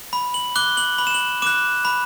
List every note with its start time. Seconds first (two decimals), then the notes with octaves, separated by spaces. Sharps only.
0.13 B5
0.34 F#7
0.56 D6 F#6 G7
0.77 F#7
0.98 B5 F#7
1.07 E7
1.14 F#7
1.42 D6 F#6 E7
1.85 B5